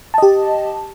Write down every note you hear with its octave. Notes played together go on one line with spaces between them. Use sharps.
G4 D#5 A5